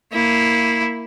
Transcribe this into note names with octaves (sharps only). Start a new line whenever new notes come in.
A#3 E4